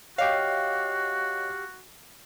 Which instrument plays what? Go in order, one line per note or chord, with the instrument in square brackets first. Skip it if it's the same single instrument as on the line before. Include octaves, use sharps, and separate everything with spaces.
[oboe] F#4 [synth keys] G4 F5 [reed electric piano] C#5 D#5 D6